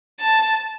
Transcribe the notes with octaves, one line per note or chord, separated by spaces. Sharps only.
A5